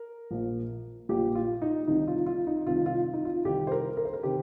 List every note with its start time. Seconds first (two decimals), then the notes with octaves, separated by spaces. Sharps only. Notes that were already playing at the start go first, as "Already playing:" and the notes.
Already playing: A#4
0.31 A#1 A#2
1.09 A#1 A#2 G4
1.35 F4
1.62 D#4
1.87 C2 C3 D#3 D#4
2.08 F4
2.26 F4
2.47 D#4
2.66 C2 C3 D#3 F4
2.86 F4
3.13 D#4
3.25 F4
3.45 C2 C3 D#3 G4
3.67 C5
3.72 A#4
3.97 A#4
4.05 C5
4.13 A#4
4.23 C3 D#3 G4